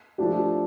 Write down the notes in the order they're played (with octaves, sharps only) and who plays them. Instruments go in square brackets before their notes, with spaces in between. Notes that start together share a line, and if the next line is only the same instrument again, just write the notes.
[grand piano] F3 A3 D4 G4